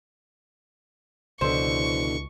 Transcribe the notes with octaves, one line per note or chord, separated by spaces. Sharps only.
C#2 B2 D3 E3 C5 C#6